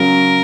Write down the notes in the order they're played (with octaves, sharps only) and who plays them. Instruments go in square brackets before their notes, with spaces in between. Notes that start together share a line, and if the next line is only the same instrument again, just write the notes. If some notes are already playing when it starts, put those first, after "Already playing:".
Already playing: [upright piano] C#3 F#3 C#4 [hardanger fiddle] A#4